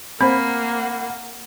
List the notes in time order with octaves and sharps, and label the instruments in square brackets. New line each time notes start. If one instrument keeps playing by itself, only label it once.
[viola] A#3 [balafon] C4 C5 [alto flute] F#5 [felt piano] B5